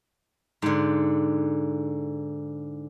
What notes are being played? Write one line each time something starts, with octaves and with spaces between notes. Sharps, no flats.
G#2 D3